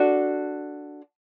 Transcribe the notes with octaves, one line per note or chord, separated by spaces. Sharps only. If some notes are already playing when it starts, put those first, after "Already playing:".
Already playing: D4 F#4 A4